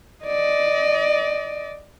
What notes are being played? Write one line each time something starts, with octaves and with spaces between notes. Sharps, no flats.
D5 D#5